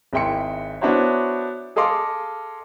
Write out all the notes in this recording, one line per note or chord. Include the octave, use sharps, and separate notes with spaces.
G#1 G#3 E4 G5 C6 C#7
B3 D4 E4 F#4 C5 C#5
G#4 A4 D#5 F5 C6 D6